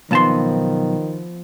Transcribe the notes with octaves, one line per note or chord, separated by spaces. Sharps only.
B1 D#3 F3 B3 C4 A5 C6